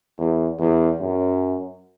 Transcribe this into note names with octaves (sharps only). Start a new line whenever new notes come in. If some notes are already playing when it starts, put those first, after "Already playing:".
E2
E2
F#2